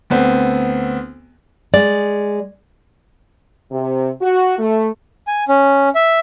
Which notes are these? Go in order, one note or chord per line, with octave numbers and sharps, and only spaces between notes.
D2 B3 C4
G#3 D5
C3
F#4
A3
G#5
C#4
E5